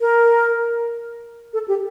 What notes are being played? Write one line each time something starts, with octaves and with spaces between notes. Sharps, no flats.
A#4
A4
G4